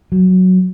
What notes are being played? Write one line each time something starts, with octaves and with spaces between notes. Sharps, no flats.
F#3